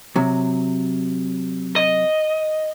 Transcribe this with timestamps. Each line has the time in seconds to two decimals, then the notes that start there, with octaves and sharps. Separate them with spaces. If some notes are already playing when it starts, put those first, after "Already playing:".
0.16 C3 F#3
1.76 D#5